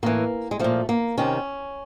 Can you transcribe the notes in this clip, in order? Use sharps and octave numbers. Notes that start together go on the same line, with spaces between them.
A2 E3 A#3
G#3
A#2 F3 A3
A#3
C3 D#3 C#4